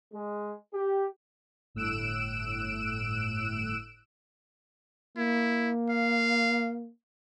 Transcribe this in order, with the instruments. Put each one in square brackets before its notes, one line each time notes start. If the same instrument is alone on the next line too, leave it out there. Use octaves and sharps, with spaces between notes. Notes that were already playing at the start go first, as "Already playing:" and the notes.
[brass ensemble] G#3
G4
[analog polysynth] G1 A2 E6 F#6 D7 E7
[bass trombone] A#3 [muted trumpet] E4
[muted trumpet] F5